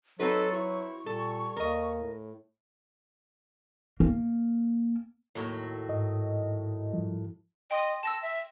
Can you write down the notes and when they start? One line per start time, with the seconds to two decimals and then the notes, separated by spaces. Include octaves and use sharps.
0.20 F#3 C4 D#4 F#4 A4 B4
0.53 E4 C#6
1.06 A#2 G3 A4
1.57 D#2 A#4 D#5
2.00 A2
4.00 A#3
5.35 D#2 A2 F#3
5.89 G#2 D#5
6.93 G2 F3
7.71 D#5 G5 C6
8.03 A5 E6 A#6 E7
8.22 E5